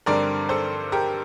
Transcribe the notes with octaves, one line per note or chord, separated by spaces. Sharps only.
G2 D3 G3 C4 A#4 D5
A4 C5
G4 A#4